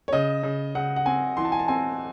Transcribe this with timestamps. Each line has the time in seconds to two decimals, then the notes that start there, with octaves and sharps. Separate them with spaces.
0.08 C#5
0.13 C#3 D#5
0.43 C#3
0.75 C#3 F#5
0.96 F#5
1.06 C4 G#5
1.37 E3 C6
1.45 A5
1.52 G#5
1.59 A5
1.68 C4 G#5